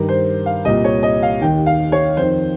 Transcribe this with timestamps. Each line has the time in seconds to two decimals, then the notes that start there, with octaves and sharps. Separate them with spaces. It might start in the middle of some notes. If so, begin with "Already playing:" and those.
Already playing: G2 D#3 A#4
0.09 C5
0.46 F5
0.65 C2 A#2 D#5
0.84 C#5
1.03 D#5
1.22 F5
1.41 D#2 D#3 G5
1.66 F5
1.92 C#5
2.17 F2 D#3 C5